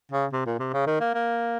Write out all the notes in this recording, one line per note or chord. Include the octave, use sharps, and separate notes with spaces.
C#3
C3
A#2
C3
C#3
D#3
A#3
A#3